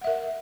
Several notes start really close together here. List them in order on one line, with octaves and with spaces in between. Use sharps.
F#5 E5 A#4